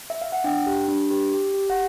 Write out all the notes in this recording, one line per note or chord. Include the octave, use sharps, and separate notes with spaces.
E5
F5
F#5
D4 G5
G4
D4
G4
G4
G4
F#5